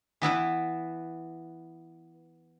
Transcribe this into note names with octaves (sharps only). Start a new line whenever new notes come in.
E3 B3 E4 B4